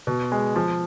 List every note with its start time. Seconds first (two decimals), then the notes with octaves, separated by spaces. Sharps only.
0.07 B2
0.32 G#3
0.56 F3